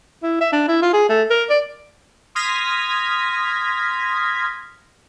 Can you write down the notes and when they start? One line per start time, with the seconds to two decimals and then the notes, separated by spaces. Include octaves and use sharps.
0.23 E4
0.41 E5
0.52 D4
0.68 E4
0.82 F4
0.93 G#4
1.09 A3
1.30 A#4
1.50 D5
2.35 C6 D#6 F6 G#6 A#6 B6